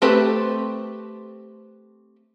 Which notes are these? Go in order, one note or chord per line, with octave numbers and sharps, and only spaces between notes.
A3 C4 G4 A4 B4